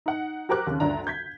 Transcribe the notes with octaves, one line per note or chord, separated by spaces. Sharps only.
D#4 F#5
F#4 G4 A#4 C5 D6 F#6
D#2 C#3
G1 D2 D4 A#5
G6 G#6 B6